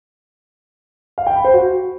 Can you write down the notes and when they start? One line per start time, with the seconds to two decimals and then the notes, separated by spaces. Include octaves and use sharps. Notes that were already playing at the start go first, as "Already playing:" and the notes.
1.18 F5
1.27 G5
1.36 B5
1.44 C5
1.53 F#4